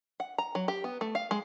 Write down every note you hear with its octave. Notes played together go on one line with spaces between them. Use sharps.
F#5
A#5
F#3
G4
B3
A3
F5
G#3